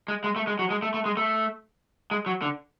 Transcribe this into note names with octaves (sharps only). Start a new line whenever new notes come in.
G#3
G#3
A3
G#3
F#3
G#3
A3
A3
G#3
A3
G#3
F#3
D3